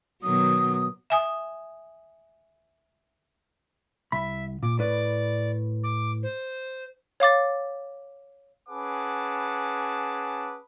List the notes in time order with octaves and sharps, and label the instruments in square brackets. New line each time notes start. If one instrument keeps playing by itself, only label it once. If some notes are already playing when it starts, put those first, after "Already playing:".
[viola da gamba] B2 D#3 F#3 [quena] D#6
[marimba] E5 G#5 D#6
[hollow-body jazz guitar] C2 B5 [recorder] E5
[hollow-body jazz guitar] A#2 [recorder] D6
[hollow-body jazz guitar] A2 B4 [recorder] D5
[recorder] D6
C5
[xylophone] C#5 F5 D6 A6
[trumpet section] C#4 G#4 B4 F#5 A5 D6